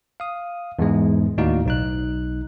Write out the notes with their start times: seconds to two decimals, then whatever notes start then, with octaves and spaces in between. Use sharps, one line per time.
0.20 F5 D#6
0.79 E2 G#2 G#3
1.38 D#2 A2 D#4 F#4 D5 F5
1.66 B1 D#4 F#6